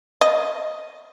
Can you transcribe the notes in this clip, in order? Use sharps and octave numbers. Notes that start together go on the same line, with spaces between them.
D#5